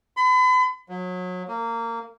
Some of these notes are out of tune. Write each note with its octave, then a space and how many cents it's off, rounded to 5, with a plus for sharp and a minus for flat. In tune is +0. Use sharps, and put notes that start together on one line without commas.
B5 +40
F#3 -30
A#3 -20